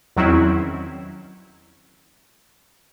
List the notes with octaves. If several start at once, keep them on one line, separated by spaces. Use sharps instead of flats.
E2 D#3 F#3 C4 C#4 E4